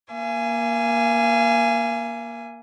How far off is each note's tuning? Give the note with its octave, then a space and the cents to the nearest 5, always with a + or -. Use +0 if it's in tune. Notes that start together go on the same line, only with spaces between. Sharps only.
A#3 +15 F5 -40 G#5 +0